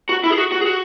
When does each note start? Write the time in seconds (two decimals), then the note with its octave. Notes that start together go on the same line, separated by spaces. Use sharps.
0.09 F#4
0.24 E4
0.30 G#4
0.38 F#4
0.52 F#4
0.61 G#4
0.65 F#4